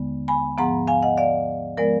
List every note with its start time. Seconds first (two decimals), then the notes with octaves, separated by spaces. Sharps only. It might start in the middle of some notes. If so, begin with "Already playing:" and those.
Already playing: D#2 D3 G#3 B3
0.28 G#5 B5
0.58 G#2 F3 B3 F#5 A#5
0.87 F5 G#5
1.03 D#5 F#5
1.17 D5 F5
1.77 F3 G#3 B3 A#4 D5